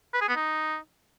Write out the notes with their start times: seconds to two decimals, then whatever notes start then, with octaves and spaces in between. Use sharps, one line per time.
0.14 B4
0.21 G#4
0.29 B3
0.36 D#4